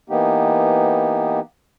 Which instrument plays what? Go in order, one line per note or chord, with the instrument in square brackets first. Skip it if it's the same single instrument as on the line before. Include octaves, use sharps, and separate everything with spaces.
[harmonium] E3 A#3 B3 D#4 G4